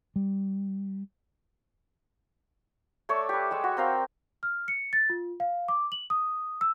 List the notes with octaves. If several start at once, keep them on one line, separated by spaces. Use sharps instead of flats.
G3
A3 C#5 D5 E5
G4 B4
G3 G#3 E5
F#4
C4 A#4 F5 G5
F6
C#7
A6
F4
F5
D6
F#7
D#6
E6